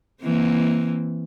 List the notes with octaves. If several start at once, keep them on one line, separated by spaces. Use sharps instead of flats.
E3 A#3 C4